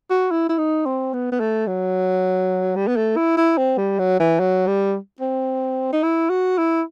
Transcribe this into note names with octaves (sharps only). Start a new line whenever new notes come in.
F#4
E4
E4
D#4
C4
B3
B3
A3
F#3
G3
B3
A3
E4
E4
C4
G3
F#3
E3
F#3
G3
C4
D#4
E4
F#4
E4